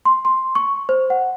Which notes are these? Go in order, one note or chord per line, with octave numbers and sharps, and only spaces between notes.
C6
C6
C#6
C5
F#5